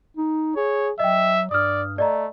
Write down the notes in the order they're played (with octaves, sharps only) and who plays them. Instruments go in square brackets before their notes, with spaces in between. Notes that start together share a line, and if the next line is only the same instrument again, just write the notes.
[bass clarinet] D#4
[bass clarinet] G#4 [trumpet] C#5
[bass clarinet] F#3 [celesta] D#5 G5 [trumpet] E5
[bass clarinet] G2 [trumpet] D5 [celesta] D#6 F6
[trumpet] A3 [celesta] D5 D#5 A#5